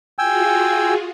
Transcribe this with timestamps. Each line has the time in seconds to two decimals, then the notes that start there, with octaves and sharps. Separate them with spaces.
0.19 F4 F#4 G#4 G5 G#5 E6